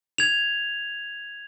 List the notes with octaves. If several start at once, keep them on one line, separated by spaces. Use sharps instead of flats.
G#6 F7